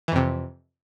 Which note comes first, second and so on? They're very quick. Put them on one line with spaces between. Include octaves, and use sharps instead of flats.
E3 F2 C3